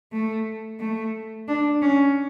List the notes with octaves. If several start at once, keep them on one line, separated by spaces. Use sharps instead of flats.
A3
A3
D4
C#4